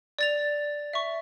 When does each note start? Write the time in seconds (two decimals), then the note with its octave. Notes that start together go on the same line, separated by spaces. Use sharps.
0.19 D5 A6 F7
0.93 E5 C#6